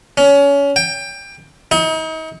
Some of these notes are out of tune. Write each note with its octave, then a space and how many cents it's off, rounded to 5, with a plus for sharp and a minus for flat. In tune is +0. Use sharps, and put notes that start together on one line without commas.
C#4 +25
G5 +20
D#4 +40